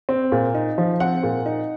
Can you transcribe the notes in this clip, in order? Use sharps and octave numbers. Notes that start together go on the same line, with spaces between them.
C4
A#2
D#4
F3
C4 F#5
A#2
D#4